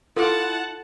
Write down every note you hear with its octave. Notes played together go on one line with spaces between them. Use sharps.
E4 F4 A4 F#5 A5 D6